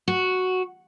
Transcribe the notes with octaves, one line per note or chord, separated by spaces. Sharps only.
F#4